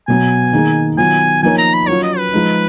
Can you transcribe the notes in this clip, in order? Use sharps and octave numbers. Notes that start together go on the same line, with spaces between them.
B2 F#3 B3 G#5
D#3 A#3 D#4 G#4
D#3 F#3 B3 F4 G#5
F3 A#3 D#4 A#4 C#5 G#5
A#5
B5
F#3 C#4 F4 C#5
D#5
B4
F3 G#3 D#4